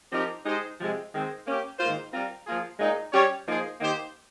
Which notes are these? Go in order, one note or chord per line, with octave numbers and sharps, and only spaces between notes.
F3 C4 D#4 G4 A#4
G#3 D#4 G4 C5 D#5
C3 F3 G#3 C4
D#3 G#3 C4
A#3 C#4 G4
G#2 D#3 A#3 F4 C5
G3 C4 F4 A#4
F3 A#3 F4 G#4
A#2 G#3 D#4
G3 C#4 G4 C#5
F3 A#3 D#4 G#4 C5
D#3 A#3 D#4 G4 C5